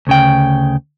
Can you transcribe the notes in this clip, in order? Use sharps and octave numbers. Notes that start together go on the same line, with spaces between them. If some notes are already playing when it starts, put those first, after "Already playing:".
D2 C#3 G5